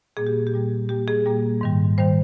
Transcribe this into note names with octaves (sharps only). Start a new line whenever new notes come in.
A#2 G3 A#3 G#4
G4
G4
A#2 G3 A#3
A#2 G3 A#3 G4
G#4
A#2 G3 A#3
G#2 D#3 G3
D#3 G3 C5